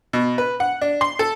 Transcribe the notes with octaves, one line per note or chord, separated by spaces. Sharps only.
B2
B4
F#5
D4
C6
A4